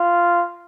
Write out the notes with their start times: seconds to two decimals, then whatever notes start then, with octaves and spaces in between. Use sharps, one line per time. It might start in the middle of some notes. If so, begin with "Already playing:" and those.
Already playing: F4